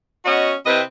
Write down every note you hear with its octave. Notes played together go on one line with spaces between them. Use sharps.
B3 C#4 F#4 D#5
C3 C4 E4 B4 D#5